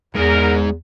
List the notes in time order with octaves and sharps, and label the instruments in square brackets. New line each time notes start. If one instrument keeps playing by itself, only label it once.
[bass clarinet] E2 [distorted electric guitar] G#2 G#4 [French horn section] E3 D#4 A#4